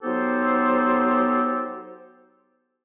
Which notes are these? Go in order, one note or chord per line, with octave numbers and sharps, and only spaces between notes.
F#3 B3 D#4 G4 A4 C5